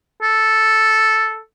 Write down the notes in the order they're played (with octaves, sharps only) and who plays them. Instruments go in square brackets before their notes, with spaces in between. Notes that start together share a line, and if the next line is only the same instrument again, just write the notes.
[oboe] A4